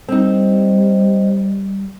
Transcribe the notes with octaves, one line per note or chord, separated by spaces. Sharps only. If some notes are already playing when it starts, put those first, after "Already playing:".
G3 C4 D#4